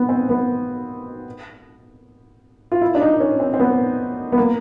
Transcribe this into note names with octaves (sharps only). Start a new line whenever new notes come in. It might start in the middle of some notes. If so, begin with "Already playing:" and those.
Already playing: B3
C4
B3
F4
E4
D4
D#4
C#4
C4
C4
B3
B3
A#3